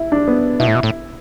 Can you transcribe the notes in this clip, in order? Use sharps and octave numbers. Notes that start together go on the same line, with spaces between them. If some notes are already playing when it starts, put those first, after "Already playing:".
Already playing: E4
D4
B3
B2 E4
A2
B2
A2